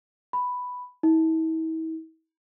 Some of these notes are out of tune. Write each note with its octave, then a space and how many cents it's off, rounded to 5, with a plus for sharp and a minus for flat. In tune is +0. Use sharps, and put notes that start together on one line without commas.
B5 +5
E4 -40